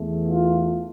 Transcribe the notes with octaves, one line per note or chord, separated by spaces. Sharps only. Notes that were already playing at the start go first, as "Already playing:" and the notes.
Already playing: E2 E3 A3
F4